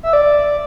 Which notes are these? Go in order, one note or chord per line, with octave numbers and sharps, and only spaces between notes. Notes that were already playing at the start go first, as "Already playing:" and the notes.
E5
D5